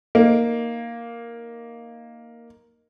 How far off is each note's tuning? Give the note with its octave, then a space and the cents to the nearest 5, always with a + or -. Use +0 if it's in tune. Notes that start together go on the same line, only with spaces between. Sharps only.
A#3 +0 D#4 +0